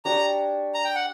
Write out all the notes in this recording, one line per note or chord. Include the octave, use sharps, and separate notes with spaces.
D4 G4 C#5 A#5
A#5
G5
F#5